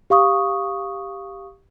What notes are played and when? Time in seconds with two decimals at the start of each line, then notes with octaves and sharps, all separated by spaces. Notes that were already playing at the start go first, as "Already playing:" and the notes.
0.10 G4 F5 C#6 D#6